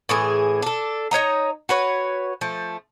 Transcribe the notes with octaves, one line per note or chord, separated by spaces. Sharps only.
A2 E3 G#4
D4 A4
D#4 C#5 D#5 A#5
F#4 B4 C#5
F3 A3